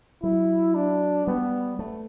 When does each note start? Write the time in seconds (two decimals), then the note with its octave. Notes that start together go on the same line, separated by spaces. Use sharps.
0.22 F#3 E4
0.75 D4
1.27 G3 B3
1.79 A3